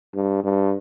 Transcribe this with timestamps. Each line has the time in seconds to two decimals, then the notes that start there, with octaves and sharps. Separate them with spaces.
0.15 G2
0.44 G2